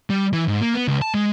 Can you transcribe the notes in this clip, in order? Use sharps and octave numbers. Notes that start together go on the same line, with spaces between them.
G3
E3
G#2
A#3
B3
C#2
A5
G#3